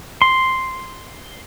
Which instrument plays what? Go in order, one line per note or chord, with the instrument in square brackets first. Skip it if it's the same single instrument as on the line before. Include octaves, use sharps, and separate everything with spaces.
[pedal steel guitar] C6